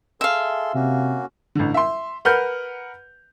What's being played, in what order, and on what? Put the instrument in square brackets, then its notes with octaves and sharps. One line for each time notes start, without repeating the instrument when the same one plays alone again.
[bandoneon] G#4 A4 C6 [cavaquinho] E5 F5
[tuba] C3 [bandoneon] A#3 C#4 F#4
[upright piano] A1 D3
E5 C6
A#4 B4 F#5 F6 G6